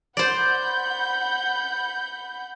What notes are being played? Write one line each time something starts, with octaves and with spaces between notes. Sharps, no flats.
C5 D5 F#5 B5 G6